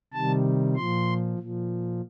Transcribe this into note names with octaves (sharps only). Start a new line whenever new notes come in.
C3 D#3 G3 A5
A#2 F3 C6
A#2
F3